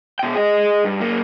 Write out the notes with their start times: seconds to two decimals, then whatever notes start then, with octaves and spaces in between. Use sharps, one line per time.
0.19 B2 G5
0.34 G#4 D#5
0.85 G2
1.00 F#3 A#3